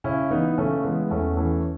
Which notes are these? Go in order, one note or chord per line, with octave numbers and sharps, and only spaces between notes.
C#3 C#4 E4
E3 B3 D#4
C#3 A3 C#4
E3 G#3 B3
E2 A3 C#4
E3 A3 C#4